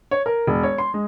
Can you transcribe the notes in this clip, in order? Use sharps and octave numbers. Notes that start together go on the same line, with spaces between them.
C#5
A#4
E1
C#5
C6
G#3